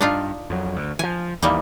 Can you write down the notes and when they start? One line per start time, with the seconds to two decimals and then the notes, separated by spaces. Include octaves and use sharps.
0.01 G2 D4 D#4 F4
0.50 F2 F#3
0.76 D2
0.99 E3 F3 G#5
1.42 D#2 E3 G3 A#3 D#4